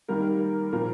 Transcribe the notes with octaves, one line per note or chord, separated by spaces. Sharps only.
D#3 G3 A#3 A#4
A#2 F3 A#3 A#4